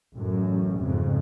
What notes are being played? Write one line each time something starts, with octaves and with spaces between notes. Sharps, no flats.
A1 F#2
F2 G#2 C#3